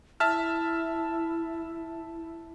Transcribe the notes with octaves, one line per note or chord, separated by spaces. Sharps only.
E4 E5 A5 F6